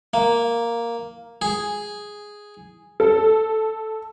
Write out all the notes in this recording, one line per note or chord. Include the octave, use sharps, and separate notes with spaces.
A#3
G#4
A4